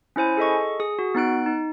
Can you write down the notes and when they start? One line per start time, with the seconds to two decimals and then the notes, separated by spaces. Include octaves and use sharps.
0.16 C#4 E4 C5 G#5
0.37 G#4 A4 D#5 C#6
0.80 G#4 D#6
0.99 F#4
1.15 B3 D#4 F#6 D7
1.46 D#4